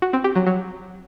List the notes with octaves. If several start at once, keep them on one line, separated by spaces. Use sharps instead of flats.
F#4
C4
G4
F#3
F#3